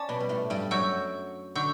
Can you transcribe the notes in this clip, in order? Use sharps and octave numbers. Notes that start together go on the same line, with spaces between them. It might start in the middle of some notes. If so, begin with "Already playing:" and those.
Already playing: C#4 D5 A5 D6
B2 B3
G3
A2 A3
G2 G3
F#2 F#3 F#5 C#6 E6 G6
D3 F#5 C#6 E6 G6